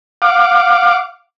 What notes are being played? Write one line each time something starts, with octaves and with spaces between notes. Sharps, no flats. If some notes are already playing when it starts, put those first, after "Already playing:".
F5 F#5 D6